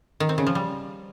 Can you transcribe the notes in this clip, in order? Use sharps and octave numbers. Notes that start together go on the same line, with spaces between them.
D#3
C4
C#3
F3
G3